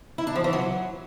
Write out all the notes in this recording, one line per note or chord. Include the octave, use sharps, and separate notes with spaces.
E4
D4
F3
E3
F#3